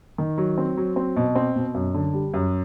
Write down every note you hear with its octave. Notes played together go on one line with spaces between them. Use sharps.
D#3
F#3
C4
F#3
C4
B2
C4
B2
F#2
D3
G3
F#2